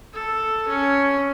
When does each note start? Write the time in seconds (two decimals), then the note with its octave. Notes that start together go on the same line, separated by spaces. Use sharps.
0.14 A4
0.68 C#4